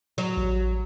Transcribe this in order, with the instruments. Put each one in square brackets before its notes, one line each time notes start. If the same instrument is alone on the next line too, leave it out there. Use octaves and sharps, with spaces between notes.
[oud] F#3
[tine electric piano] A1